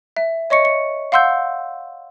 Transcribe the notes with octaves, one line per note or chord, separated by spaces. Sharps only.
E5
C#5 D#5 C#6 C#7
C#7
F5 F#5 C6 E6 G6